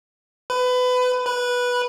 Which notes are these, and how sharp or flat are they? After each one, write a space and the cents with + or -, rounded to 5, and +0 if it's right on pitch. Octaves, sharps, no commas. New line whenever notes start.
B4 +25
B4 -10